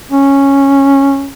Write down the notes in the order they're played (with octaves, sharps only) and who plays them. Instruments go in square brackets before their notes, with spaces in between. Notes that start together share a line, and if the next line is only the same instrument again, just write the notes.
[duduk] C#4